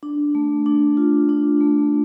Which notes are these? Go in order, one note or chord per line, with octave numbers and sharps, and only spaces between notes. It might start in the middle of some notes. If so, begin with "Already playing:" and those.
D4
A3
D4
F4
D4
A3